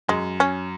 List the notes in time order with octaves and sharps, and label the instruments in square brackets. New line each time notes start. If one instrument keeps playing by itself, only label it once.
[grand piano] F#2 [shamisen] G#3
[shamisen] C#4